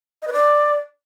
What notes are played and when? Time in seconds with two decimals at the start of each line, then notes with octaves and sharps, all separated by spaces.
0.22 D#5
0.27 B4
0.33 D5